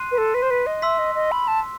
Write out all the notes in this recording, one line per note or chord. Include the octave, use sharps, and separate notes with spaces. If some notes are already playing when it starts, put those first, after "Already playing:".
Already playing: C6 F#6 C7 D#7
B4
A4
B4
C5
B4
D#5
E5 C6 E6 B6
D#5
D#5
B5
A5